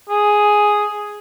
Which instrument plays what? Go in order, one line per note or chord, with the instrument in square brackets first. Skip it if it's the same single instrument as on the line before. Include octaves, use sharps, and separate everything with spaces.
[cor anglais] G#4